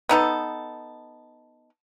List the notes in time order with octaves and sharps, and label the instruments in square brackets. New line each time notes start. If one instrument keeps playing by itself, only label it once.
[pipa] B3 D#4 A4